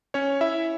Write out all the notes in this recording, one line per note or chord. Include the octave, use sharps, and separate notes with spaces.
C#4 C#5
E4 E5